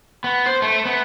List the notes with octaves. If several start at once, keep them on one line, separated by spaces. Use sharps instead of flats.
B3
C5
A3
B3